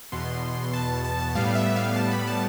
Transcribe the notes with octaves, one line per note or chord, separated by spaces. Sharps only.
E2 B2 B3 C6
A5
A5
A2 G3 B3 F5
E5
F5
A5
B5
A5